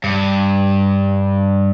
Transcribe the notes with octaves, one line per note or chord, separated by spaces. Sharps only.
G2